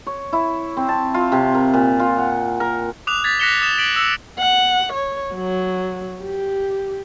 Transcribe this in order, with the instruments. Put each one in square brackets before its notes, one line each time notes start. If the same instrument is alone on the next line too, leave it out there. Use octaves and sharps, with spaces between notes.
[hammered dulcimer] C#5
E4
C4
A5
F4
C3
A#4
A#2
F4
F#5
A#4
[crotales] D6 D#6 F#6 F7
G#6 A6 B6
F#6 A#6 B6 C#7 E7 G7
D#6 E7
B6 D7 F#7
E6 C#7
[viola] F#5
C#5
F#3
G4